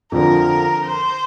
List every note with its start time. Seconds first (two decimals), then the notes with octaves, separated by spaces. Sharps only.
0.12 F2 D3 F3 A#4
0.86 C5